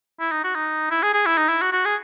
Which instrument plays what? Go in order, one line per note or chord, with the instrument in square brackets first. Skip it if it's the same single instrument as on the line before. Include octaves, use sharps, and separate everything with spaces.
[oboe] E4
D#4
F#4
D#4
E4
G#4
G#4
E4
D#4
E4
F#4
F#4
G#4